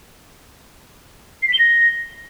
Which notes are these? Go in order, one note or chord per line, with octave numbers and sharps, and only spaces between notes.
C7
B6
G7
A#6